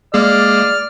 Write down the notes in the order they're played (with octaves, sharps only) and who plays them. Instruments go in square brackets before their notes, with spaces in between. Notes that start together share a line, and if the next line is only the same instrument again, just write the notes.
[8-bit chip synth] G#3 A#3 G#4 [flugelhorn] D5 [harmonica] F6